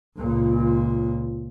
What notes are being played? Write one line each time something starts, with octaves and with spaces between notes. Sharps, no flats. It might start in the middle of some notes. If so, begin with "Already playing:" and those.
C#2 A#2